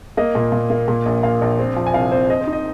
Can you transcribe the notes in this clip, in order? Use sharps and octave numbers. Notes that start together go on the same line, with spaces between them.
A#3 D#5
A#2
A#2
A#3
A#2
A#1
A#2 F5
A#1
C4
F3
G#5
C2 F5
C4 C5
C4 D#5
C5
D#4
D#5